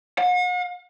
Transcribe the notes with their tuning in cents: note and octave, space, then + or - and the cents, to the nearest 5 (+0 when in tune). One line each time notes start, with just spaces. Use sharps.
F#5 -45